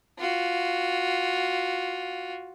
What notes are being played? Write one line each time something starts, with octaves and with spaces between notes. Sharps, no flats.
F4 F#4